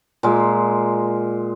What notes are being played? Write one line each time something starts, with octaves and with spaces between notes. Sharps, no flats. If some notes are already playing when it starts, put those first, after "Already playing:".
A#2 G#3